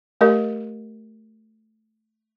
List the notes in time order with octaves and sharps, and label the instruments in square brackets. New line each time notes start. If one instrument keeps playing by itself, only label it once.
[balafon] A3 G4 A#4 D#5